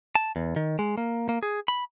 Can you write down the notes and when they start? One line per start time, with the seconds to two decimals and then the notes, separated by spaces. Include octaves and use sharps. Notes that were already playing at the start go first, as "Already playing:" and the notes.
0.15 A5
0.36 E2
0.56 D#3
0.79 G#3
0.98 A#3
1.29 A#3
1.43 G#4
1.68 B5